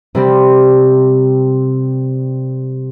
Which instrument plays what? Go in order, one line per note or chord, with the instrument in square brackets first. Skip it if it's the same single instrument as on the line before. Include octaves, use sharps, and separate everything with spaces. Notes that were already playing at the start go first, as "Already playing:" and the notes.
[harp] C3 G3 C4